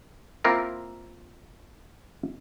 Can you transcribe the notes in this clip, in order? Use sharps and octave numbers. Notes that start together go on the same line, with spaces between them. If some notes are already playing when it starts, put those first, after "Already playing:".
A#3 C4 E4 F4 A#4